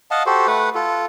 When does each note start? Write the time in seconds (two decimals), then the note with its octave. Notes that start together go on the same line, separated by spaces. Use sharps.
0.11 D#5 F5 F#5 A5
0.26 F#4 G4 A4 C5
0.47 A3 B4 F#5
0.75 F4 A4